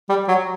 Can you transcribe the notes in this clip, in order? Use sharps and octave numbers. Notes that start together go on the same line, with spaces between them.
G3
F#3